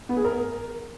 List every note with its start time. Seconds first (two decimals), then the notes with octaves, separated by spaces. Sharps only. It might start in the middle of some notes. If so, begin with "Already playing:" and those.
0.09 B3
0.17 G#4
0.25 A#4